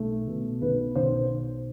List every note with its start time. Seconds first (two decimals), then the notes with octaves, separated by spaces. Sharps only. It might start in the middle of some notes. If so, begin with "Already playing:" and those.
Already playing: B1 A3
0.27 B2
0.61 B1 B4
0.95 B1 C5